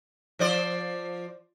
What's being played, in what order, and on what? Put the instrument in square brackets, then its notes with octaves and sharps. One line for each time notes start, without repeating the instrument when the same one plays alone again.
[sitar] F3 C5 D5